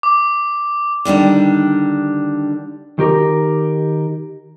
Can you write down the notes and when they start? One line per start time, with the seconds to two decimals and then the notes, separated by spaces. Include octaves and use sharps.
0.03 D6
1.05 D3 D#3 G3 D4
2.99 D#3 G4 A#4